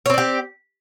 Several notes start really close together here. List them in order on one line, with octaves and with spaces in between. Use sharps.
C#5 C4 D5 G4